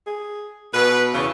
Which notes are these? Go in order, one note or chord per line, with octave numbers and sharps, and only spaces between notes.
G#4
B2 B4
E2 C#3